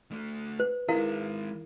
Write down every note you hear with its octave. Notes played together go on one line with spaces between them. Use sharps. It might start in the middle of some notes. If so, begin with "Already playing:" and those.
A3 D4
B4 C5
D#3 G#3 E4 A#4 F5